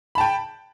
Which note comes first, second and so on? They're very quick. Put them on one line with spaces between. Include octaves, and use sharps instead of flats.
B5 A5 G5